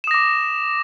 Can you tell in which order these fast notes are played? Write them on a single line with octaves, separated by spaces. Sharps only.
E7 D#6 A#6 D6